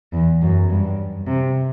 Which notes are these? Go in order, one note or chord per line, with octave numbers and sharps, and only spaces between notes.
E2
F#2
G2
C3